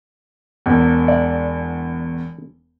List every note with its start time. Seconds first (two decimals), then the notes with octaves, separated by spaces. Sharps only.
0.66 E1 E2
1.08 D5